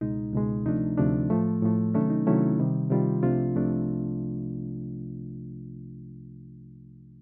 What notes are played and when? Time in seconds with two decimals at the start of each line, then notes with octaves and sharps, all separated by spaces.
0.01 C#2 B2 G#3 D#4
0.33 C#2 B2 G#3
0.66 D2 C3 F3 A3 D4 D#4
0.98 D2 C3 F3 A3 D4
1.30 A2 F3 A3
1.63 A2 F3 A3
1.94 C3 D#3 F#3 A3 C#4 D4
2.10 D#4
2.27 C3 D#3 F#3 A3 C#4 E4
2.59 C3 D#3 G3
2.90 C3 D#3 G3 F4
3.23 C2 C3 F3 A3 D4 F4
3.56 C2 C3 F3 A3 D4